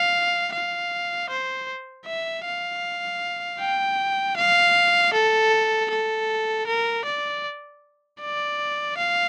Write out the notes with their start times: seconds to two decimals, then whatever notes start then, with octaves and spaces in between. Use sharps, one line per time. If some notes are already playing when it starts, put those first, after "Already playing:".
Already playing: F5
0.53 F5
1.30 C5
2.06 E5
2.45 F5
3.60 G5
4.37 F5
5.14 A4
5.90 A4
6.67 A#4
7.05 D5
8.21 D5
8.97 F5